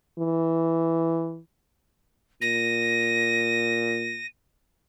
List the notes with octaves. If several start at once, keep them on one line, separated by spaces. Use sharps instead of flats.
E3
A#2 A#6 D#7